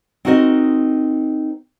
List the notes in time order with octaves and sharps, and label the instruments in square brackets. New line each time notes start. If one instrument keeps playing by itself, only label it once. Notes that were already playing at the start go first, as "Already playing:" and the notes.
[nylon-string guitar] C4 D#4 F#4 A#4 C5 D#5